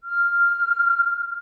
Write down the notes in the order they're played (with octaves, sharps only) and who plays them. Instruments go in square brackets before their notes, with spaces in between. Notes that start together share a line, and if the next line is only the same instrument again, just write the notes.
[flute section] F6